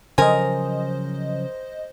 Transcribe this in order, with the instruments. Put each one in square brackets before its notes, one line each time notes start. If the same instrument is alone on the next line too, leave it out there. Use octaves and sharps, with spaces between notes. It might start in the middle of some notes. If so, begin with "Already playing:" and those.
[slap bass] C#3 F3 F#3 [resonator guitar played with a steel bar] A#4 G#5 [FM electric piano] C5 D#5